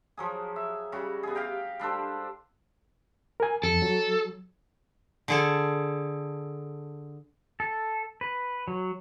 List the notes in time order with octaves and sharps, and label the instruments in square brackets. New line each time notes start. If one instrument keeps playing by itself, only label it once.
[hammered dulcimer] F3 F#3 G#4
E5
C#3 G3 F#4
B3 G#4
G4 F5 G5 A#5
G3 D4 A4 C5
[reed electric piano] A#4 G#5
[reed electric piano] F2 [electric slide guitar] A4
[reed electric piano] F#3
[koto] D3 G#4 A4
[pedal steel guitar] A4
B4
F#3